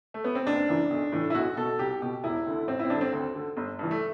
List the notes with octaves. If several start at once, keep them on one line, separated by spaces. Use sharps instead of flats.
A3
B3
C4
F#1 D4
F#2 E3
B1
A2 E3
E4
B1 F#4
B2 A4
C2 G4
B2 G4
E1 E4
D2 D3
A1 C4
E4
C4
G2 D3 D4
C4
D2
D3
G1
G2 E3
A3